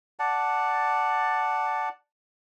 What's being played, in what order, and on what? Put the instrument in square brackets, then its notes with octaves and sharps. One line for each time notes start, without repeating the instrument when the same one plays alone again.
[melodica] D5 F#5 A5